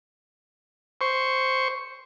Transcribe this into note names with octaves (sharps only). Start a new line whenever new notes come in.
C5 C#6